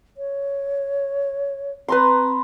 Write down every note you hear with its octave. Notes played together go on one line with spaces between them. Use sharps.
C#5
C4 B4 A#5 C6